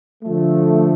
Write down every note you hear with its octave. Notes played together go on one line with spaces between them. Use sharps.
D3 F3 A3